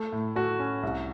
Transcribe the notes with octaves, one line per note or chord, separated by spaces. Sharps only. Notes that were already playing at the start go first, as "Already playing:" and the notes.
Already playing: A3
A2
A3 F#4
C#4
C2